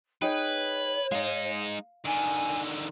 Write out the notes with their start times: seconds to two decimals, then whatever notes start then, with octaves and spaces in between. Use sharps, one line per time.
0.22 D#4 G#4 B4 C#5 G5
1.12 G#3 D#4 F5
2.05 D3 D#3 G#5